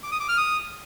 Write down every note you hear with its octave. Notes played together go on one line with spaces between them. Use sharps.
D6
D#6
D6
F6
D#6